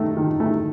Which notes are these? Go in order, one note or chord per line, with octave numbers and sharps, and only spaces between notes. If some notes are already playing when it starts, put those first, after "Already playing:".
Already playing: D#3 A3
D#3
A3